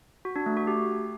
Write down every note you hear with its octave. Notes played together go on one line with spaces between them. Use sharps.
F#4
D4
A3
F#4
G4